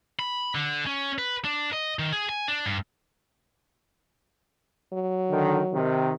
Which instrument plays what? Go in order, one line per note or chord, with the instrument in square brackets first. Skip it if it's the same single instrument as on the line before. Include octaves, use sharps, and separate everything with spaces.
[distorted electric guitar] B5
D3
C#4
B4
D4
D#5
D#3
G#4
G#5
D4
G2
[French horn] F#3
[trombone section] D3 D#3
C3 D#3